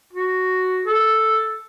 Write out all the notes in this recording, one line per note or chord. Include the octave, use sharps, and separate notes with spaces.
F#4
A4